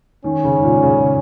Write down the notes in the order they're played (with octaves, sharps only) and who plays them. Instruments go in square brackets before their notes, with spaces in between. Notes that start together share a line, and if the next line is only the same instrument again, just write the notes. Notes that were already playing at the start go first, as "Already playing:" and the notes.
[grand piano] D#3 [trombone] C#4
[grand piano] C#3
G#2
A#2
C#3